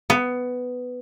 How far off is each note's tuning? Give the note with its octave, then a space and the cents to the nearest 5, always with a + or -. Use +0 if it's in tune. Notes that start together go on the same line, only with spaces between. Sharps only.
B3 +10